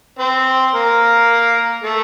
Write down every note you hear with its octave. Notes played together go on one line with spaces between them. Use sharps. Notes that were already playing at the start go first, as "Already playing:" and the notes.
C4 C5
A#3 A#4
A3 A4